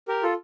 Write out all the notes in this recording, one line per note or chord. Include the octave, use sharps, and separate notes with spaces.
G4 A#4
F4 A4